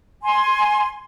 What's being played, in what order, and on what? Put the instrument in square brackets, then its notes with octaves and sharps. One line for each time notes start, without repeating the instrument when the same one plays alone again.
[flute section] G#5 C6